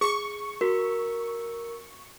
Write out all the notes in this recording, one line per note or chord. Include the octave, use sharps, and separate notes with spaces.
G#4 C#6
F#4 A#4